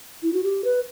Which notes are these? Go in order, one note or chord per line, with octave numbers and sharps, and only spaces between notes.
E4
F#4
G4
B4